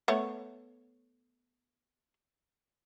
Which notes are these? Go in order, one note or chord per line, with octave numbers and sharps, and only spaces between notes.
A3 B3 C#5